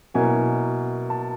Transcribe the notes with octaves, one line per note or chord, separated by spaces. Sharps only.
B2 F#3 A#3 C#4 E4 G#5
A5